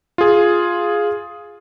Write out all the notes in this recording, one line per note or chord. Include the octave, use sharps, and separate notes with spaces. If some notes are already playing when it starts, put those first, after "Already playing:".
F4 G#4